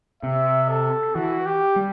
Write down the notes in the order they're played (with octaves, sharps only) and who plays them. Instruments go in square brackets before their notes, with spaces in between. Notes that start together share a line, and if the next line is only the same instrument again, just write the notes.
[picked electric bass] C3 [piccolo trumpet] E5
[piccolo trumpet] A4
[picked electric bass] E3 [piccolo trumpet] F#4
[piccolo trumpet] G4
[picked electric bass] G3